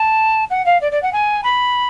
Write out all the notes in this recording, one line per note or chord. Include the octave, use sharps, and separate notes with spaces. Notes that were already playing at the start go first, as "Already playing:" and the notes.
Already playing: A5
F#5
F5
D5
D5
F#5
G#5
B5